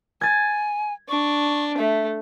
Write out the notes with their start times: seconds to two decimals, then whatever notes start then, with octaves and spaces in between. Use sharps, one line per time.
0.21 G#5 G#6 A6
1.09 D4 C#6
1.78 A3 E5